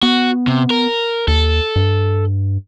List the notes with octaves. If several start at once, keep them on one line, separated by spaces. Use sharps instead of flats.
B3 F#4
C3
A#4
D#2 A4
G2